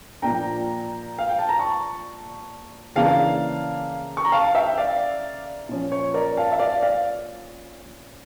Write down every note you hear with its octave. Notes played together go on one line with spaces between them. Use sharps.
A#2 F3 A#3 D4 G5 A#5
F5
G5
A5
A#5
A5 C#6
C#3 E3 A#3 D4 F5 A5
C#6
A#5
F5 A5
E5 G5
D5 F5
A#2 F3 C#4
C#5
A#4 D5
F5 A5
E5
D5 F5
D5 F5